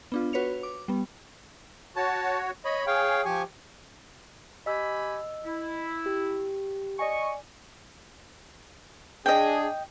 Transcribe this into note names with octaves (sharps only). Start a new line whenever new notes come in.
B3 D4 F4
F#4 B4 C#5 C#7 F7
D6
G3 B3
F#4 C#5 A5
C#5 D#5 B5
G#4 C#5 F5 G5
F3 G4 G#5 C#6
G4 D#5 G#5 B5 E6
E4
G4
D5 D#5 G#5 C#6
D4 G#4 D#5 G5